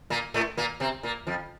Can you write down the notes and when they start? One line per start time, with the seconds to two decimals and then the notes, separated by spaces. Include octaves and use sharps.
0.10 A#2 A#3
0.34 A2 A3
0.57 A#2 A#3
0.80 C3 C4
1.03 A#2 A#3
1.27 F2 F3